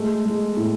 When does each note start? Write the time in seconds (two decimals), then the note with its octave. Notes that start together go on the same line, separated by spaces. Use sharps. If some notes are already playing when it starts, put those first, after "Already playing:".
Already playing: G#3 A3 A4
0.26 G#3
0.57 A2